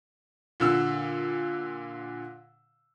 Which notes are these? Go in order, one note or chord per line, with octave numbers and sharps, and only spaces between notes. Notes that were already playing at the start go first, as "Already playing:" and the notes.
A#2 D3 E6